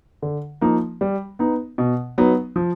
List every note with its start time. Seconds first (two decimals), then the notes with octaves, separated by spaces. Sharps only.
0.22 D3
0.61 F3 A#3 D#4
1.01 G3
1.39 B3 D#4
1.78 B2
2.18 F#3 B3 D#4
2.56 F3